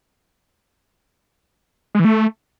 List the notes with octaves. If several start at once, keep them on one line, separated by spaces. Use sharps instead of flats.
G#3
E3
A3